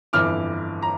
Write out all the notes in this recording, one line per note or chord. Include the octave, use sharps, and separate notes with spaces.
G1 F2 E3 D6 F6
A#5